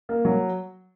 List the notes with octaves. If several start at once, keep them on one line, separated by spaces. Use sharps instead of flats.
A#3
F#3